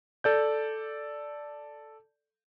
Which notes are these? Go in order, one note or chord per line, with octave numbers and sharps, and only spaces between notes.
A4 D5 G6